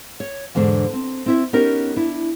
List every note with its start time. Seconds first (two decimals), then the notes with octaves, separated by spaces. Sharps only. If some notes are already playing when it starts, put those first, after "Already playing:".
0.20 C#5
0.55 E2 G#2 D3 D4
0.93 C4
1.26 C4 E4 E5
1.53 B3 C#4 D#4 G4 A#4
1.96 D4 E4